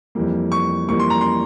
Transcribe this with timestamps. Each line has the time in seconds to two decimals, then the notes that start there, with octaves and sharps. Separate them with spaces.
0.15 F2 E3 G3 A#3
0.52 C#6
0.89 F2 E3 G3 A#3 C#6
1.00 C6
1.10 A#5
1.21 C6